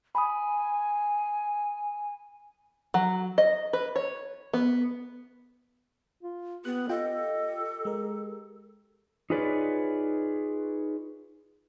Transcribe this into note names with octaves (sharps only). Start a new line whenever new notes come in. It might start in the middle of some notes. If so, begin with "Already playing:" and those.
G#5 B5 D#6
F#3
D#5
B4
C#5
B3
F4
B3 G4 B4 F#6
F4 A4 D#5 G5
G#3 A#4
D#4 F4 G#4 B4 C#5 D5